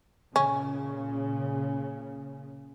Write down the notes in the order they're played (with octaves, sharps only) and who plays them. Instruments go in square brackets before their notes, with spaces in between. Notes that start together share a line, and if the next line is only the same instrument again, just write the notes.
[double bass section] A#2 C#3 [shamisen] C#4